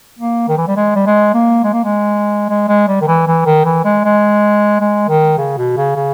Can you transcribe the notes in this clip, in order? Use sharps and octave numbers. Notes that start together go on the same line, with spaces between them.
A#3
D#3
E3
G3
G#3
G3
G#3
A#3
G#3
A#3
G#3
G#3
G#3
G3
D#3
E3
E3
D#3
E3
G#3
G#3
G#3
D#3
C#3
B2
C#3
C#3